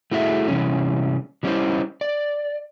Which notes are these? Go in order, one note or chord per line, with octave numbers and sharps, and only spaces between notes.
A3 E4 F#4 G#4 D5 E5
C3 E3 G3 C#4
E3 G3 C#4 D#4 E4 C5
D5